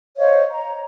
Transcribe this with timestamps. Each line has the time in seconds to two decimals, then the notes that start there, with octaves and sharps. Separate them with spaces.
0.18 C5 C#5 D#5 F5
0.49 A#5